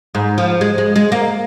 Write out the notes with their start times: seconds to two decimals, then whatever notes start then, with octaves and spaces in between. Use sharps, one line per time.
0.15 G#2
0.38 F3
0.61 G#3
0.78 G#3
0.96 G#3
1.12 A#3